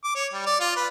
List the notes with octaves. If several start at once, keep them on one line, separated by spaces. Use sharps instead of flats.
D6
C#5
G3
D5
F4
B4